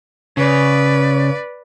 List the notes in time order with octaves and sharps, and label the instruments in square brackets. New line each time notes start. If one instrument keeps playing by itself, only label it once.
[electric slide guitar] C#3 [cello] B4 D5